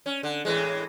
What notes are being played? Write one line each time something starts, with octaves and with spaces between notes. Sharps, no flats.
C#4
D3
A2 E3 G#3